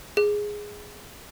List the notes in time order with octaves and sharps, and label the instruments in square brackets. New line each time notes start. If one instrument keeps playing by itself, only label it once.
[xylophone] G#4